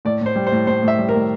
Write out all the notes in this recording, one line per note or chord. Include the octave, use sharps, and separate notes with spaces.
A2 D5
A2 C5
G3
C5
A2
A2 C5
A2
E5
G3
A#4
A2